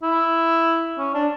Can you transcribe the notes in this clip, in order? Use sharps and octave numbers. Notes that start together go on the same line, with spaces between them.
E4
C#4
D4